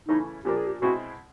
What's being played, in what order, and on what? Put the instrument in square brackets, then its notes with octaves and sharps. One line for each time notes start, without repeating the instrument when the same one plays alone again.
[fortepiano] C#3 E3 A3 C#4 E4 [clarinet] D#4
[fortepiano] A#2 F3 A#3 D4 [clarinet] G4
[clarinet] G#4
G4
[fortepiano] B2 G#3 C4 E4 [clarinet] F#4